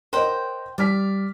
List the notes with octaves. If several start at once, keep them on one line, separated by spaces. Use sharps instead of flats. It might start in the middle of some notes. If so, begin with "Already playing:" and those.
A#4 C5 C#5 D#5 F#5 G5
G3 D5 F6 B6